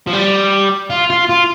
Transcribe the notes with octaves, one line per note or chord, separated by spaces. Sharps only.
F3
G3
F4
F4
F4